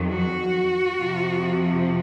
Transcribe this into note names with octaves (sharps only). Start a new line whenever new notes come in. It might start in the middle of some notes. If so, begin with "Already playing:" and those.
Already playing: F2 D#3 F#3
F#4
F2 C3 F3